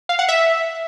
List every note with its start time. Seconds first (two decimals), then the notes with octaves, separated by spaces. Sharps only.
0.09 F5
0.19 F#5
0.29 E5